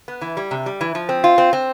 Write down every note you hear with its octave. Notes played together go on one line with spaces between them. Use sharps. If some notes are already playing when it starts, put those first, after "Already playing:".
B3
E3
G3
C3
G3
E3
F3
C4
F4
C4
C4